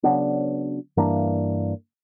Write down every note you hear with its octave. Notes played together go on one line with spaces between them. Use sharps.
C#3 F#3 B3 D4
G2 E3 A#3 D4